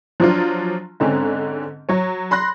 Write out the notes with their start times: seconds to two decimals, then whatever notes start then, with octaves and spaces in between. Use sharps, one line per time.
0.20 F3 F#3 D4 F4
1.00 G#2 D3 C4 C#4
1.89 F#3 C#5
2.31 B5 C6 F#6 A#6